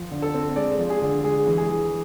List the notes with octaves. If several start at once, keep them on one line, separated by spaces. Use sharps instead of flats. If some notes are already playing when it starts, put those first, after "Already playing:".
Already playing: F3
D3
A4
C4
G#3 D5
F3
G#4
D3
G#3 G#4
E3
G#4
E3